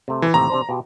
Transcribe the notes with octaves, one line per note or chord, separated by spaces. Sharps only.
C3 A3
E3
D#2 A2 C3 A#5
C3 D4 C5
B2 F4 G4